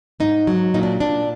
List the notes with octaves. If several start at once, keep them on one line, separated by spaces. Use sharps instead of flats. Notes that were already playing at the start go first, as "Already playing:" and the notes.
G#2 D#4
F#3
A#2 D#4
D4
A#2 D4